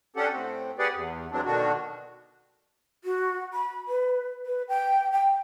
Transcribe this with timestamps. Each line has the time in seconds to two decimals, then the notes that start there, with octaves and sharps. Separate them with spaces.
0.16 C#4 D4 G4 A4 F#5
0.31 A2 C4
0.79 G4 G#4 B4 D5 F#5
0.94 E2
1.31 E3 F#3 G#3 C4 D4
1.45 B2 D3 D#3 D4 F#4
3.04 F#4
3.54 B5
3.88 B4
4.46 B4
4.69 G5
5.12 G5